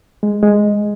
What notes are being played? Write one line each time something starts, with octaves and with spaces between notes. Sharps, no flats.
G#3
G#3